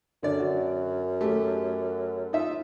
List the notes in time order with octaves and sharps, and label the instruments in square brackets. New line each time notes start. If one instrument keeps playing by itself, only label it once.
[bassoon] F#2 [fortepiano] D3 D5
[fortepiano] F#4
A3 G4
D#4 F4 E5